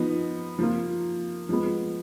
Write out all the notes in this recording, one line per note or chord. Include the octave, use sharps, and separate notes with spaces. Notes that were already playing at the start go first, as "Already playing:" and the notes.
Already playing: F3 B3 D#4
F3 A#3 F4
F3 G#3 B3